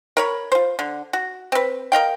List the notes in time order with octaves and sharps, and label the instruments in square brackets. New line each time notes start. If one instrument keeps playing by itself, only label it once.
[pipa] A#4 C#5 B5
F4 C5
D3
F#4
C4 B4
A#4 D#5 F5 G5